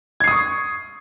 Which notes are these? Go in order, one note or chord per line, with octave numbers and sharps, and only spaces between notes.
C#6 D#6 G#6 C7